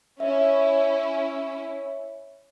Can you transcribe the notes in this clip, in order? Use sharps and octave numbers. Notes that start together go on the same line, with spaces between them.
C#4 E4 E5